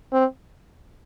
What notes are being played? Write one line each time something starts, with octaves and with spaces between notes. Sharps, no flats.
C4